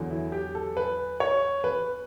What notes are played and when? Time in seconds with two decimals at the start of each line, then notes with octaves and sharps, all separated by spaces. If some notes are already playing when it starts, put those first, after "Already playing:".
Already playing: E2 D3 F#3
0.11 E4
0.32 G4
0.55 A4
0.77 B4
1.20 C#5
1.64 B4